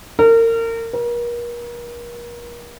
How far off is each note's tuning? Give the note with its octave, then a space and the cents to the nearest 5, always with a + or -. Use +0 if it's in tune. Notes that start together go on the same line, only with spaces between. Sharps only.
A#4 -30
A#4 +40